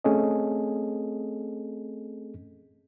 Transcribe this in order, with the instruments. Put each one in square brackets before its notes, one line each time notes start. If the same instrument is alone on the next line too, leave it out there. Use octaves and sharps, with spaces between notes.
[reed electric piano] A3 C4 C#4 G#4 A4 D#5